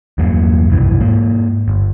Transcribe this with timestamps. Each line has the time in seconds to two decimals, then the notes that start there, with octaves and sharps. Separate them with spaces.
0.18 E2 G2 F#3 A#3
0.70 F1 B1 G2 E3
1.00 G#2 A#3
1.68 G1